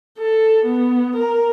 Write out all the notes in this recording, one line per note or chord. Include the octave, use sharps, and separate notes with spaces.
A4
B3
A#4